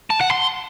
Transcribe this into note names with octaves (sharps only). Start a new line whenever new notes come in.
A5
F#5
C6